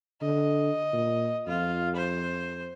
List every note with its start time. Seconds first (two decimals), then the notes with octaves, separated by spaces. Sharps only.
0.21 D3 D#5
0.93 A#2
1.47 F2 F4
1.96 C5